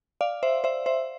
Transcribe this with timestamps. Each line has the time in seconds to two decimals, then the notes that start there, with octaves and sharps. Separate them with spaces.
0.21 D5 F5
0.43 C5 E5
0.64 C5 E5
0.86 C5 E5